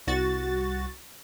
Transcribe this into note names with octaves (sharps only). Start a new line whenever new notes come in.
C2 F#4 A6